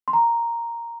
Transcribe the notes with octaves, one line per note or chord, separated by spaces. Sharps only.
C6
A#5